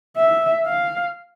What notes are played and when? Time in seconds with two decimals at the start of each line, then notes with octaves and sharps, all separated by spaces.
0.17 E5
0.66 F5